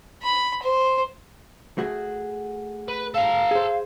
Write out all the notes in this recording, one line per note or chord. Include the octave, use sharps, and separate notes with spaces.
B5
C5
A3 F#4 G#4
B4
A4 F5 A#5
G#4 C5